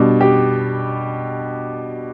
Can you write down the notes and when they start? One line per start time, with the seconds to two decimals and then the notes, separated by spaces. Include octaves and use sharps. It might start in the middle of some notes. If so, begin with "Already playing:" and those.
Already playing: B2 G3 D4
0.21 G4